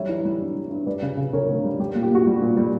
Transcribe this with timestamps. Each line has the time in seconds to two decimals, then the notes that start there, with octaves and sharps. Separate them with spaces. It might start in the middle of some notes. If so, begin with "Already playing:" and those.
Already playing: F#3 G3 C#5 E5
0.09 E3
0.25 G3
0.40 G2
0.55 G3
0.71 G2
0.86 G3 B4 D5
1.02 C#3
1.17 C#3
1.33 C#3 A#4 C#5
1.49 D2
1.64 G3
1.79 G3 G4
1.95 A#2
2.03 G4
2.11 A#2 F#4
2.27 G3
2.42 A#2
2.57 G3